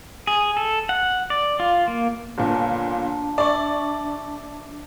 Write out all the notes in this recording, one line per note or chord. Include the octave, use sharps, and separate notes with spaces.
G#4
A4
F#5
D5
F4
A#3
G1 A#2 D4
D5 E5 C#6